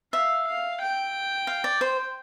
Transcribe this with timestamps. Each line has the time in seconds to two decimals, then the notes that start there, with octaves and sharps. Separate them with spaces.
0.13 E5 F5
0.47 F5
0.81 G5
1.47 F5
1.64 D5
1.81 C5